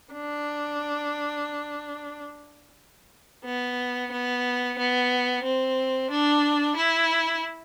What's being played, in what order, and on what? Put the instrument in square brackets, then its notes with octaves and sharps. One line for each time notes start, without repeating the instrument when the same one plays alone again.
[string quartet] D4
B3
B3
B3
C4
D4
E4